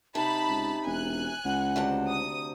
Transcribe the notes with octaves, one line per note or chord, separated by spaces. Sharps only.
C3 D#4 A5 B5
C#2
E1 G#5 F#6
C#2 F#5
D2 C3 A5
D#6